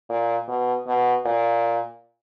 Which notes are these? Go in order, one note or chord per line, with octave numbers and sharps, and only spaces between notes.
A#2
B2
B2
A#2